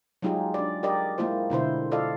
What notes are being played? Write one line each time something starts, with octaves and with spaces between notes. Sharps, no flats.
F#3 G#3 D#4 F4 G4 G#4
D4 D5
G4 A#4 D5 D#5
G#3 A#3 E4 F4 C5
B2 D3 E4 C5
F4 A4 D5 D#5 F5